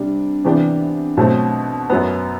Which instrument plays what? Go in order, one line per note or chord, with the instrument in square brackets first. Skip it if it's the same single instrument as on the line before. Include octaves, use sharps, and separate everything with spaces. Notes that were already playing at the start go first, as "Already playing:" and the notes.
Already playing: [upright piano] C3 G3 D4
C3 E3 B3 D4 G4
B2 F#3 A3 C4
F#2 F#3 B3